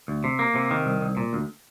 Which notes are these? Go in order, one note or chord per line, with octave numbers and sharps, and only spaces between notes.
D2
C3
A#3
C3
D#3
C2
C2
A#2
D2